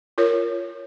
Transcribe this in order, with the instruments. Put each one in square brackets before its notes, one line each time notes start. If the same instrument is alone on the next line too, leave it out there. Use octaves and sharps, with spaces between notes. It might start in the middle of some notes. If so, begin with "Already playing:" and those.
[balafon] F4 A#4 C#5